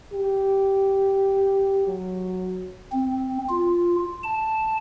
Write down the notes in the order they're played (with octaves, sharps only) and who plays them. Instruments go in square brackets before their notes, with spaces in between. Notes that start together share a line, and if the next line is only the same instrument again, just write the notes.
[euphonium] G4
F#3
[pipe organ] C4
F4
A5